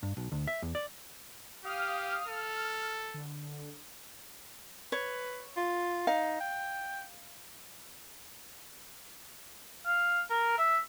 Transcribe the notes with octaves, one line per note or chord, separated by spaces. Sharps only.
G2
B1
D2
E5
E2
D5
G4 F5 D#6 F6
A4 F6
D3
B4 C#5
F4
D#4 F5
G5
F5
A#4
E5